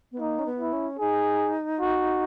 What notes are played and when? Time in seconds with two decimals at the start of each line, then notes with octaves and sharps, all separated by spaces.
0.12 B3
0.20 A#3 D#4
0.39 C#4
0.46 B3
0.59 E4
0.73 C#4
0.99 D#4 G#4
1.80 F#4